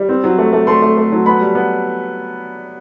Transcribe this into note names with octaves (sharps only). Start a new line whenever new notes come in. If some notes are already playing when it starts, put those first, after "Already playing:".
Already playing: G3
C4
F#3
A3
A3
A3 C6
A3
A3
F#3
B3 B5
G3
B3